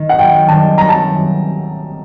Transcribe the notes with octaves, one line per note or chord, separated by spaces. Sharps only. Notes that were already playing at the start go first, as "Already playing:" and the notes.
Already playing: D#3
F#5
F#2 G5
D#3 G3 A5
F#2 A#5
A5